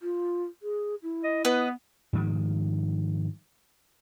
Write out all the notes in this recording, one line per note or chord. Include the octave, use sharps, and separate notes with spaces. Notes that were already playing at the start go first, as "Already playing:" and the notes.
F4
G#4
E4
D#5
B3 B4 D#5
G#2 D#3 F3 G3